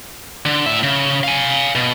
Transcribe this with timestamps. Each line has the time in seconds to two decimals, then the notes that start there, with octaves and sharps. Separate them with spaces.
0.45 D3
0.66 A2 E5
0.83 C#3
1.23 F5 G#5
1.75 B2